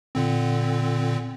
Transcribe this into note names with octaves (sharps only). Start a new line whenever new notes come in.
A#2 D3 C4